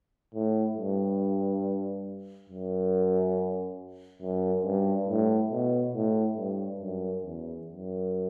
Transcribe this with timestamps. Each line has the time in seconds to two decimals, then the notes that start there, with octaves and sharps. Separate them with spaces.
0.35 A2
0.77 G2
2.49 F#2
4.22 F#2
4.65 G2
5.09 A2
5.51 B2
5.94 A2
6.38 G2
6.81 F#2
7.24 E2
7.67 F#2